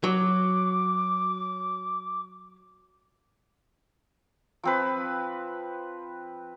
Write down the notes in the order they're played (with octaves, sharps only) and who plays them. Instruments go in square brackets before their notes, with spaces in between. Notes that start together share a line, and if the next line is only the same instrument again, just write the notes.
[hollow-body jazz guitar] F#3 [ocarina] D6
[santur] F3 C4 B4